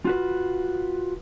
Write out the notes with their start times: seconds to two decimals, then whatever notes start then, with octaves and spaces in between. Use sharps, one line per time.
0.05 F4 F#4 B4